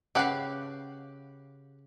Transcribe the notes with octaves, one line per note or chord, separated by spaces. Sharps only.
C#3 G4 B4 F5 F#5